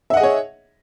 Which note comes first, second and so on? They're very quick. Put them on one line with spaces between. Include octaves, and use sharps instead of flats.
E5 F#5 D#5 G#4 C#5